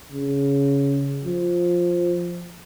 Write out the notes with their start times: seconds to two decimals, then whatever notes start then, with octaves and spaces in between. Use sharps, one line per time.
0.12 C#3
1.24 F3